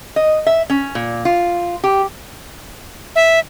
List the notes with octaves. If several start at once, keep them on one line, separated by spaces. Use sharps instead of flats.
D#5
E5
C#4
A#2
F4
G4
E5